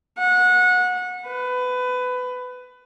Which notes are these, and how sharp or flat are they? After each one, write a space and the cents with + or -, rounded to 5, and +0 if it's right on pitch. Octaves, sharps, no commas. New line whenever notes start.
F#5 -25
B4 +20